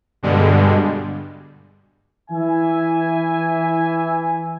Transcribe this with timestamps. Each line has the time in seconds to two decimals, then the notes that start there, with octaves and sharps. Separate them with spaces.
0.23 G2 B2 D3 G3 G#3
2.31 E3 E5 G#5